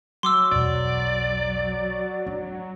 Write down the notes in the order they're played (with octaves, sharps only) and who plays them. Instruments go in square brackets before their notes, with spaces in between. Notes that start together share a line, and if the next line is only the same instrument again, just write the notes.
[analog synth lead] F#3 [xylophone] C6 D6 E6
[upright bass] B1 E2 [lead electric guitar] D5
[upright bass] D4